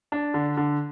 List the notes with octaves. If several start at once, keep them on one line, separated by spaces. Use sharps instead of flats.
D4
D3
D3